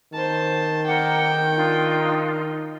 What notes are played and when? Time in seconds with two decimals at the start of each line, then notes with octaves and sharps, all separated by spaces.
0.13 D#3 C5 A5
0.86 A#4 F#5 G5 D6
1.55 D4 D#4 F4